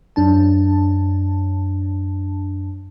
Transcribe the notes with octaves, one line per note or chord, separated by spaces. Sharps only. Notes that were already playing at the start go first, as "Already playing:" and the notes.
F#2 D4 A5